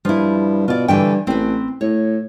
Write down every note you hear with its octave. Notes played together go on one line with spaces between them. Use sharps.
G2 F3 E4
B2 F4 D5
G2 D3 E3 G5
A1 C4 B4
A2 C#5